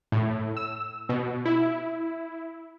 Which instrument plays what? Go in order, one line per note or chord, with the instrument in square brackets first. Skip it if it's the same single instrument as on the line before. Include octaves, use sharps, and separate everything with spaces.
[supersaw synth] A2
E6
B2
E4